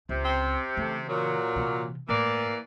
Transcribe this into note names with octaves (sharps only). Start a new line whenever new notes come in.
C#2 C3
C4
C#3 E3 A3
A#2 F#3
C3 E3
A2 E3 A#3 D5